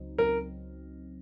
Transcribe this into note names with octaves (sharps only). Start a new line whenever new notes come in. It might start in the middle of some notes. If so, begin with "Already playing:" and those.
Already playing: C#2 C#3 F#3 C4 D#4
C#2 C#3 F#3 C4 D#4 A#4